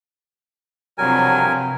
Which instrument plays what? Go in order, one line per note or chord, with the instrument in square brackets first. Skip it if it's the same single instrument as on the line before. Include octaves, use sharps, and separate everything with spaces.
[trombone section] G2 F3 F#3 [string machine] C3 [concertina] A#4 G#5